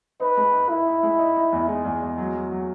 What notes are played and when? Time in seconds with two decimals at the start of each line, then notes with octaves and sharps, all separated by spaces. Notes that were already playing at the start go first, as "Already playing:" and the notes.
0.20 D#4 B4
0.37 G#3
0.53 D#4
0.69 D#4 E4
0.86 D#4
1.03 G#3
1.19 D#4
1.36 D#4
1.53 E2
1.68 G#3 D#4
1.85 E2
2.02 E2
2.18 F#3
2.35 F#3
2.52 F#3